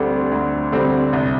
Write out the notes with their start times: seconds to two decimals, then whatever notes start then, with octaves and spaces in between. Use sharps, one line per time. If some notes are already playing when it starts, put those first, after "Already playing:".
Already playing: D2 D3 G3 C4
0.32 D2
0.72 D3 G3 C4
1.13 C2